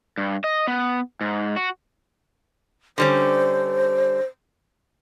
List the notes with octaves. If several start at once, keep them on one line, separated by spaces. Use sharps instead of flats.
G2
D#5
B3
G#2
F#4
D3 G3 C#4 C5